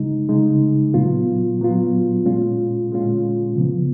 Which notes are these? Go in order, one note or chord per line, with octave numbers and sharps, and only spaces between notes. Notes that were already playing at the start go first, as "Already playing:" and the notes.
Already playing: C#3 G#3 D#4
C#3 G#3 D#4
A#2 F#3 B3 F4
A#2 F#3 B3 F4
A#2 G#3 C#4 F4
A#2 G#3 C#4 F4
C#3 F3 B3